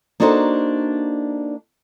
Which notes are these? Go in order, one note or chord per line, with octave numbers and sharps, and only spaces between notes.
A#3 D4 D#4 F#4 A4 C5